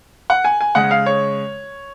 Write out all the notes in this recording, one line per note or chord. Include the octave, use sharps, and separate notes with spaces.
F#5
G#5
G#5
C#3 G#3 F#5
F5
C#5